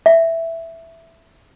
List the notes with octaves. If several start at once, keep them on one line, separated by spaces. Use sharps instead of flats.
E5